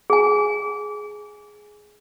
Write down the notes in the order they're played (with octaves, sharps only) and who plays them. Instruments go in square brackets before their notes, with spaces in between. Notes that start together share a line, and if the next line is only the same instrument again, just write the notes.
[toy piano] G#4 G#5